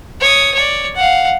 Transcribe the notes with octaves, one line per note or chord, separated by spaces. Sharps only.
C#5 D#6
C#5 D5
F5 F#5